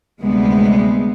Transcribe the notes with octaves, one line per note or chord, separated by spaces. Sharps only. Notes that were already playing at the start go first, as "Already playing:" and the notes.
D2 C3 G3 G#3 B3